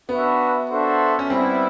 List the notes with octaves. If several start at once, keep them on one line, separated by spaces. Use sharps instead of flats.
B3 D4 F#4 B4 E5
D4 F#4 A4 C5 E5
C#4
G3 B3 C4 E4